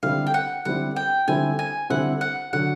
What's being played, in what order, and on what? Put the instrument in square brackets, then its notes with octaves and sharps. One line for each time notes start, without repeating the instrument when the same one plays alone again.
[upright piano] D3 G3 C4 E4 [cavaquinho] F5
[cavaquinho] G5
F#5
[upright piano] D3 G3 C4 E4 [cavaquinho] F#5
[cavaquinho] G5
[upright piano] D3 G3 C4 E4 [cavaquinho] G#5
[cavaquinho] G#5
[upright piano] D3 G3 C4 E4 [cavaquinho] F#5
[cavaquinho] F#5
[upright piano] D3 F#3 [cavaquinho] F#5